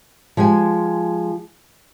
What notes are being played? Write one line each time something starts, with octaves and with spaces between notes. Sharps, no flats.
F3 G#3 G4 G#5